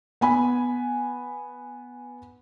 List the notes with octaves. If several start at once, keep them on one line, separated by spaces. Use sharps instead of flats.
B3 G#5 B5